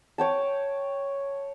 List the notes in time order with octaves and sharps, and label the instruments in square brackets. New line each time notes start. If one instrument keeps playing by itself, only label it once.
[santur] C#5 G5 A5